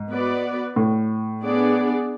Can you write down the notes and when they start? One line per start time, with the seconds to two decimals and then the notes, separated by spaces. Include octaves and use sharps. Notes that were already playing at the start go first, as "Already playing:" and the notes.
Already playing: G#2
0.09 B3 F#4 B4 D5
0.76 A2
1.43 B3 D4 G#4 D5